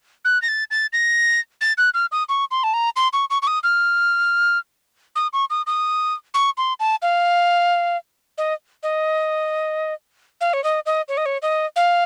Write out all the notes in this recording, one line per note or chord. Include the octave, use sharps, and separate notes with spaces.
F#6
A#6
A6
A6
A#6
A6
F#6
F6
D#6
C#6
C6
A5
A#5
C6
C#6
C#6
C#6
D#6
F6
D#6
C#6
D#6
D#6
C#6
C6
A5
F5
D#5
D#5
F5
C#5
D#5
D#5
C#5
D#5
C#5
D#5
F5